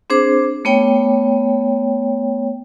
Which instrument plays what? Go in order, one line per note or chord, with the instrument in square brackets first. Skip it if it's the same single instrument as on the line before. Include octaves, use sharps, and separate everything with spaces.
[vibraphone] C4 D4 G#4 C5 D6
A3 B3 C#5 G5